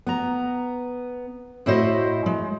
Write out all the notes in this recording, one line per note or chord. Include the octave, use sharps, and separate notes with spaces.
B3 A#5
A2 E4 F#4 C5 D#5
G#3